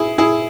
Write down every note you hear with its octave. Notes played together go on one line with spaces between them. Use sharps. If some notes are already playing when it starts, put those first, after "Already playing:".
Already playing: E4 G#4
E4 G#4